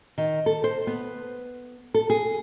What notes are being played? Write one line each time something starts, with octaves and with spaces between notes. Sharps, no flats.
D#3
A4
C5
B3
A4
G#4